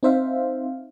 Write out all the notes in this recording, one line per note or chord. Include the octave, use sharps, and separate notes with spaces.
C4 D#4 C5 E5 F5